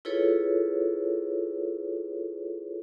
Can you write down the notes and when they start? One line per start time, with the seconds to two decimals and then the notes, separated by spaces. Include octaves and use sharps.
0.05 E4 F4 G#4 A4 B4 C#5